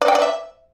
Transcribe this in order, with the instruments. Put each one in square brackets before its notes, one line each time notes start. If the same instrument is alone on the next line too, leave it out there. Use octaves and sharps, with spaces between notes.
[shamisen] D5
G5
D5
E5